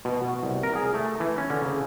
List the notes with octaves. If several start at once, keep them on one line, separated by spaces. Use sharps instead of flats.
B2
F#4
C2
A#4
G#4
A3
E3
C#4
D3
C#3